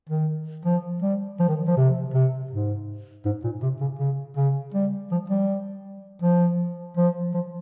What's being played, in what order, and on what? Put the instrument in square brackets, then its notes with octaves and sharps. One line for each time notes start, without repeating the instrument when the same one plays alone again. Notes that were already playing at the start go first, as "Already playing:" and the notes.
[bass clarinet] D#3
F3
G3
F3
D#3
F3
C3
C3
G#2
G#2
A#2
C3
C#3
C#3
C#3
G3
F3
G3
F3
F3
F3